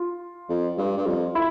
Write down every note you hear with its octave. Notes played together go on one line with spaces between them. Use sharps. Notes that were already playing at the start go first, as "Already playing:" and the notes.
Already playing: F4
F2
G2
G2
F2
E4